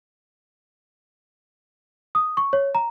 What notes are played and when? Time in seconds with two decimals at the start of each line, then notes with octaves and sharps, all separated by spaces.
2.15 D#6
2.37 C#6
2.53 C#5
2.75 A#5